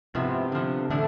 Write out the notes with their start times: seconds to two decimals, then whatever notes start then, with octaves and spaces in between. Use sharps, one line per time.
0.15 G#2 C3 F3 B3 E4
0.52 D3 F3 B3
0.90 A2 D3 E3 A3 D4